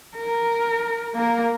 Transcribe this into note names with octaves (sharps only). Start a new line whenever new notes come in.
A#4
A#3 A#4